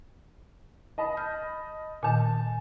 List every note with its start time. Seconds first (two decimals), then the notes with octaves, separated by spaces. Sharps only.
0.98 D#5 A5 B5
1.17 F6 G6
2.03 A#2 D#3 G#5 A5